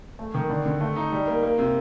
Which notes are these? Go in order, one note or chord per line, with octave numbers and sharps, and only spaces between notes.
A3
D#3
D3
D3
A3
D#4
G3
A#3
A#3
C3